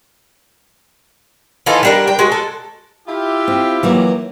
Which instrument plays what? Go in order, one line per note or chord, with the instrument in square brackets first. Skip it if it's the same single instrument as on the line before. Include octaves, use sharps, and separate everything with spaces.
[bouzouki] E3 D#4 F4 A4
G3 D4 A#4
G5
G#3 F#4
A4
[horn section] E4 F4 G4
[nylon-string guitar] C4
E3 F#3 A#3